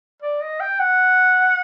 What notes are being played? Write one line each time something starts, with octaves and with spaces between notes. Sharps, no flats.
D5
D#5
G5
F#5